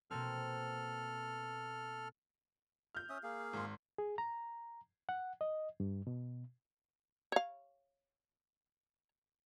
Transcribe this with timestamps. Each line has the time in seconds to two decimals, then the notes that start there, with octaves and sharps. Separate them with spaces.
0.11 B2 A#3 C4 A4 F6
2.95 F6 G6
3.09 C#4 E5 D#6
3.23 A#3 G#4 F5
3.53 G#1 C6
3.98 G#4
4.18 A#5
5.09 F#5
5.41 D#5
5.80 G2
6.07 B2
7.32 C#5 F5